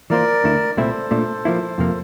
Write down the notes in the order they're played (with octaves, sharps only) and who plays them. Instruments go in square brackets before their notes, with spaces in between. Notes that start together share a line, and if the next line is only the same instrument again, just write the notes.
[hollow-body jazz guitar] E3 A#3 F4 C5 [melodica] A#4 D5
[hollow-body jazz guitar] D2 D3 A3 E4
[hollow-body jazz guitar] C2 A#2 A3 C4 E4 [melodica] A4 C5
[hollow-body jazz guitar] A#2 A3 D4
F3 A#3 E4
F2 C3 F3 A#3